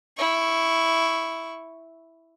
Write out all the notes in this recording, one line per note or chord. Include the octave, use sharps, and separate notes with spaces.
E4 C#6